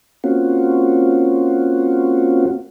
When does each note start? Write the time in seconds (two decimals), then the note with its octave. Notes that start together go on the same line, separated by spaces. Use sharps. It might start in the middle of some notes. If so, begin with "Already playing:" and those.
0.24 A#3 C4 C#4 F4 F#4